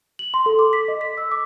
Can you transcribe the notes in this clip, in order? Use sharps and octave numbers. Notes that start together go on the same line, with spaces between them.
F#7
C6
A4
D6
B6
D#5
B6
E6
D6